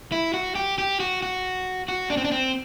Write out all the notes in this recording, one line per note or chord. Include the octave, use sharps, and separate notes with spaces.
E4
F#4
G4
G4
F#4
F#4
F#4
D4
C4
D4
C4